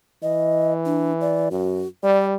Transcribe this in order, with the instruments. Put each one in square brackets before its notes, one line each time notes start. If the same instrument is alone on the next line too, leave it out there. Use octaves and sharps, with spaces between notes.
[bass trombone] E3 [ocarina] D#5
[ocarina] D4
D5
[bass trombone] F#2 [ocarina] F#4
[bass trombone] G3 [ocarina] D5